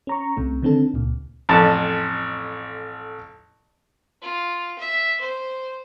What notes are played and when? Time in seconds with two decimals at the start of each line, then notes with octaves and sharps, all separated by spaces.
0.07 C#4 A#5 C#6
0.37 C2 C3 A3
0.62 D3 D#3 C4 D4 A4
0.94 C#2 A#2
1.49 A1 F2 A5
4.22 F4
4.78 E5
5.21 C5